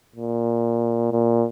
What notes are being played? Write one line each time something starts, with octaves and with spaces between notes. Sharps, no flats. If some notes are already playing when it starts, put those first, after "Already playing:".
A#2
A#2